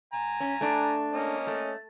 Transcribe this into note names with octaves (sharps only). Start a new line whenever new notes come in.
G#5 A#5
C#4
A3 D4
A#3 C#4 D#5
A3